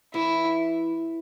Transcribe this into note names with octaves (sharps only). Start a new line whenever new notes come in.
E3 E4